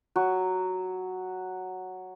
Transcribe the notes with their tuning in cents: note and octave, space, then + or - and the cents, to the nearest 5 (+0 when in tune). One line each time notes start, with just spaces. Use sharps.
F#3 +0 F#4 +0